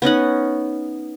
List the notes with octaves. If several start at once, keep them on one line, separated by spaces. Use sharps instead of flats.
B3 C#4 D#4 F#5